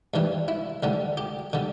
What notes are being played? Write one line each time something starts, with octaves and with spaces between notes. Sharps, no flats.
G2 E3 G3
E4
D2 D3 G3
G4
D3 G3